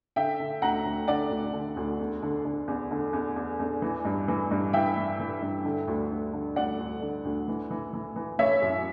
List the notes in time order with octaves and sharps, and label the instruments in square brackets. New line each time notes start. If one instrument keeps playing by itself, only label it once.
[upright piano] D3 E5 G5
D3
D2 F#5 A#5
D2
D3 D5 F#5
D2
D3
D2
E2
D3
D3
E2
D3
E2
E2
E2
E3
G2
E3
G2
E3 E5 G5
E3
E3
G2
D3
D2
D2
D3
D2 D5 F#5
D2
D3
D2
E3
E3
E3
E3
E3 C#5 E5
F#2